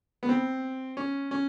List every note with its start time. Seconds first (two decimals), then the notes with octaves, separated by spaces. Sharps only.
0.23 B3
0.29 C4
0.97 C#4
1.31 C#4